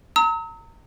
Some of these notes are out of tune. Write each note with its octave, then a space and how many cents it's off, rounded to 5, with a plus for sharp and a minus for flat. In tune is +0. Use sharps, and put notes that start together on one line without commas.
A#5 -30 E6 -45